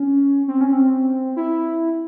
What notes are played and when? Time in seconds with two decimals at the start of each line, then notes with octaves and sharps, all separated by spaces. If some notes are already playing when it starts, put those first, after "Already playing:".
Already playing: C#4
0.48 C4
0.61 C#4
0.73 C4
1.36 E4